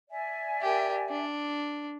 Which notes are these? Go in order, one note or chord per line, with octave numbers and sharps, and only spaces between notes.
D5 E5 G#5
G4 A#4
D4